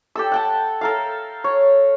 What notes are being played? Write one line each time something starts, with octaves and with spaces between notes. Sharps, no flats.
G4 A4 E6
F#5 G5 A5
A4 A#4 F5
C#5